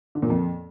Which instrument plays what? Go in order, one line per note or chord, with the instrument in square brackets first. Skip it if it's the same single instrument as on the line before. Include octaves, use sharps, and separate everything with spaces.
[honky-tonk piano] D3
A#2
F2